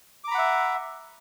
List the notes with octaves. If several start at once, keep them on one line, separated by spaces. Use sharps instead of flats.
E5 F#5 A#5 B5 D6